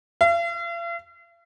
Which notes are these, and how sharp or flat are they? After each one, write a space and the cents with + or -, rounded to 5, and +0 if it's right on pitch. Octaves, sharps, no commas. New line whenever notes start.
F5 -45